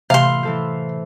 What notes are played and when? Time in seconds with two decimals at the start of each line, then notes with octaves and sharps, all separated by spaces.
0.10 A2 C3 E3 F5 C6
0.43 E3 A4 C5